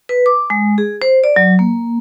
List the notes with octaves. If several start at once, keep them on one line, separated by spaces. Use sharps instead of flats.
B4
D6
G#3
G#4
C5
D5
F#3
A#3